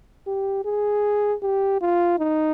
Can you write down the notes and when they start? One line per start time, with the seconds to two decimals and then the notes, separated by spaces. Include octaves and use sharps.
0.27 G4
0.65 G#4
1.42 G4
1.81 F4
2.18 D#4